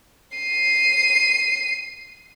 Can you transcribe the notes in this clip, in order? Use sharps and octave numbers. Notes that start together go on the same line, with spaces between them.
C7 D#7